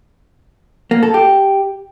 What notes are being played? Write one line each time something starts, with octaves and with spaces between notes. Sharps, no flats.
A#3
A4
G4